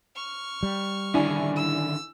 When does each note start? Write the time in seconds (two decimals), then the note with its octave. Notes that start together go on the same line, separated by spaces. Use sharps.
0.15 C#6 F6
0.63 G3
1.14 D3 D#3 C#4 D4 E4 G#5
1.56 E6